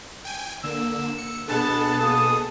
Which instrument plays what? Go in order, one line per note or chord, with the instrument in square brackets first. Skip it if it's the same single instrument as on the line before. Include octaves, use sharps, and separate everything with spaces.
[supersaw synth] G5 G#5
[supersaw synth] D3 A#3 [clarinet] E6
[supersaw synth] C#7
[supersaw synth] B2 G#4 A4 [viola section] B3 A5 [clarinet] D4
[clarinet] A#3 [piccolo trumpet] D#6